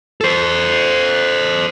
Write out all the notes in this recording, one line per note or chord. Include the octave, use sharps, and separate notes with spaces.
A4 C5